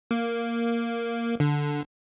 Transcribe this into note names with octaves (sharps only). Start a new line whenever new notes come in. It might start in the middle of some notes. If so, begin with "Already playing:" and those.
A#3
D3